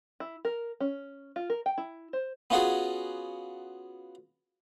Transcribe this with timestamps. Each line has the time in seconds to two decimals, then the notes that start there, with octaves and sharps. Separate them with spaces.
0.20 E4
0.45 A#4
0.80 C#4
1.36 F4
1.50 A#4
1.66 G5
1.78 E4
2.13 C5
2.50 B3 C#4 F4 F#4 G#4